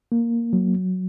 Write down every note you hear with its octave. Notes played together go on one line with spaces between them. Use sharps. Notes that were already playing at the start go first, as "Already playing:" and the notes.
A#3
F#3